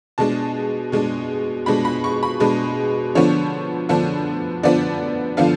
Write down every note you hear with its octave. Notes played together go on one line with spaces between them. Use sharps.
B2 G#3 D4 A5
B2 G#3 D4
B2 G#3 D4 B5
B5
C#6
B5
B2 G#3 D4
D3 F3 B3 D4 C#5
D3 F3 B3 D4
D3 F3 B3 D4 D5
D3 F3 B3 D4 F5